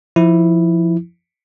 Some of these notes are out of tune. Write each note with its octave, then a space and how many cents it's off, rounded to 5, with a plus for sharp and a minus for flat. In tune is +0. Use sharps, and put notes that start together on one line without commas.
F3 -15 E4 -5